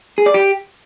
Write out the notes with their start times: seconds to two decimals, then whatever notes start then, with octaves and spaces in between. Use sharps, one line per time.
0.18 G#4
0.26 D5
0.34 G4